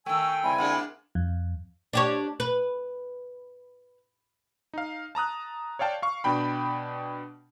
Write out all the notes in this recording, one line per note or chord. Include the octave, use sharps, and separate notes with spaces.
D#3 A3 G5 G#5 E6
C#3 G3 C4 E4 G#5
A#3 D4 G#4 F#5
F2
D4 G4 C#5
B4
D#4 F5
A5 A#5 D#6 F#6
C#5 D5 F5 G5 A5
F5 C#6
B2 D4 G5 B5